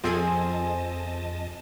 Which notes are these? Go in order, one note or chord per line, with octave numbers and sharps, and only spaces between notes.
F2 F3 C4 G#4 A4 D#5 G#5 A5